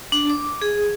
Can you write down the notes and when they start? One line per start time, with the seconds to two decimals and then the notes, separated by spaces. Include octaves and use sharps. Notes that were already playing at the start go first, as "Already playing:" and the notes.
0.12 D4
0.30 D6
0.62 G#4